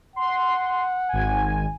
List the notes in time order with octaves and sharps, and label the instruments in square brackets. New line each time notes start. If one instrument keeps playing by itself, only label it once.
[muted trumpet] F#5 [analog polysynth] C6
[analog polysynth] G#1 G#5